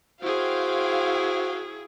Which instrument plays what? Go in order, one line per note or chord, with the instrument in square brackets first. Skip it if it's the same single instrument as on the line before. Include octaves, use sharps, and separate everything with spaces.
[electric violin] E4 G#4 [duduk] F#4 [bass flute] C5 [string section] F5 G5